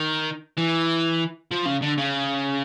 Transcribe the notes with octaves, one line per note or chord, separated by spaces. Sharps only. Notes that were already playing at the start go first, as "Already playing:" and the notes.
Already playing: D#3
E3
F3
C#3
D3
C#3